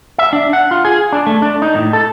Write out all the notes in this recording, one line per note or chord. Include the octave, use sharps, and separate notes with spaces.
E5
D4
F#5
F4
G#4
D4
A3
D4
D#4
A2
A4